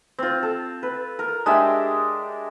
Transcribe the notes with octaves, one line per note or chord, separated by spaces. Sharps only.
C4 F4
A4
B4
A#4
G#3 D4 G4 E5